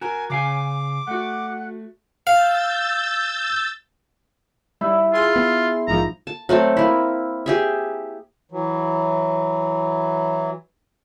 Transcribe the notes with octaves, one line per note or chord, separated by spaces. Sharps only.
F#4 A#4 G#5
C#3 F5 G#5 D6
A3 F#4 F#5
F5 E6 G6 A6
G3 E4
F4 G#4 C6
B3
A#1 G#2 F3 A#5
A5
F#3 A3 C4 A4
A#3 E4
G4 G#4 E5
E3 F#3